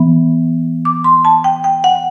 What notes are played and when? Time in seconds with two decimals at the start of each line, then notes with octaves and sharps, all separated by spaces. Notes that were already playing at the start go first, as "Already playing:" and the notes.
Already playing: E3 B3
0.85 D6
1.04 C6
1.25 A5
1.44 G5
1.64 G5
1.84 F#5